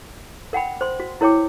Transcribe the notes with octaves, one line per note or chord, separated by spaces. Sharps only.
A#4 F#5 G5 B5
C5 C6
F#4
E4 A#4 C#5 G5 D6